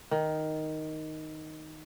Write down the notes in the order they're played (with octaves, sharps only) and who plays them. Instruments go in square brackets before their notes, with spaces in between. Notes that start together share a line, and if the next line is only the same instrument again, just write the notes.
[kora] D#3